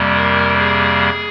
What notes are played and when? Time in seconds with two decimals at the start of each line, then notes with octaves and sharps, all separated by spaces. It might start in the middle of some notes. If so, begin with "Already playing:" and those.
Already playing: F2 C3 G3 A#3
0.16 A#4
0.58 G#4